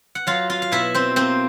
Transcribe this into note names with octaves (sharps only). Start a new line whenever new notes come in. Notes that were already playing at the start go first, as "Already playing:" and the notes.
F#5
F#3 F4 F5
F4 F5
F5
B2 E4 E5
C4 C5
A#3 C4 C5